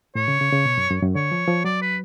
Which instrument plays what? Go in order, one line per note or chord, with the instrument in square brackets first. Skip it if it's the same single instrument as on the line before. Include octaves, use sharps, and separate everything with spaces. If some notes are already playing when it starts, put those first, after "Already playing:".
[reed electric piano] A2 [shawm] C#5
[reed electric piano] C#3
C#3
C#3
B2
F#2
F#2
F#2
[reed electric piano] D3 [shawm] C#5
[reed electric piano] F3
F3
[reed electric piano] F#3 [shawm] D5
[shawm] B4